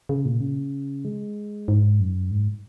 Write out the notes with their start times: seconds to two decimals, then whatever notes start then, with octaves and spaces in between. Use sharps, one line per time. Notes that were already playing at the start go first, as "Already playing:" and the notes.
0.09 C#3
0.25 A#2
0.41 C#3
1.05 G#3
1.68 G#2
2.00 F#2
2.31 G#2